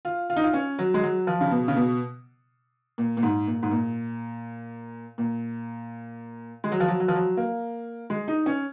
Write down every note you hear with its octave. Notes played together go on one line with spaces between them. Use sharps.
F4
F4
D#4
F4
C#4
F#3
G#3
F#3
F3
C#3
B2
C#3
B2
A#2
A#2
G#2
A#2
G#2
A#2
A#2
G#3
F#3
F3
F#3
F#3
F3
F#3
A#3
G#3
D#4
C#4